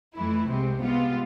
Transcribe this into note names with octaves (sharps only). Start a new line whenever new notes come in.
F2 E3 A3 E4
C2 C3 G#3 C4
C3 G#3 B3 F4